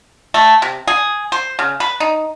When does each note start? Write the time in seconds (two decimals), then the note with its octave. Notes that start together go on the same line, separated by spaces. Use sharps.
0.34 A3
0.62 C3
0.87 G#4
1.32 C5
1.59 C#3
1.80 B4
2.00 D#4